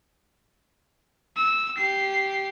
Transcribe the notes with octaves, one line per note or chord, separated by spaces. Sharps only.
E6
G4 C7